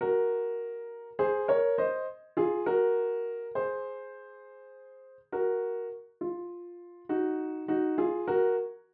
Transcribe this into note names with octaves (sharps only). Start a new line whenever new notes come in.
F#4 A#4
G#4 C5
A#4 C#5
C5 D#5
F4 G#4
F#4 A#4
G#4 C5
F#4 A#4
F4
D#4 F#4
D#4 F#4
F4 G#4
F#4 A#4